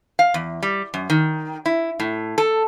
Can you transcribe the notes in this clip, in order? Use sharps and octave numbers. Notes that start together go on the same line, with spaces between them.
F5
E2
G3
F#2
D#3
E4
A2
A4